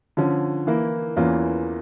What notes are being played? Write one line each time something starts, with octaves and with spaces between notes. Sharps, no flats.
D3 F3 C#4
E3 A#3 E4
E2 E3 A#3 C#4 F4